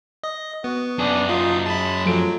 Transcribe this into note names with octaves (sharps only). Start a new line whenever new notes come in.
D#5
B3 F#4
F#2 D4 G#4
D#4 F4
G#3 A5 B5
F3 F#3 A3 D7